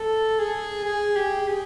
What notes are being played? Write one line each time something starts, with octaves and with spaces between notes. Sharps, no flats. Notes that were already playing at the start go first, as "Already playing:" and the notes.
Already playing: A4
G#4
G#4
G4
G#4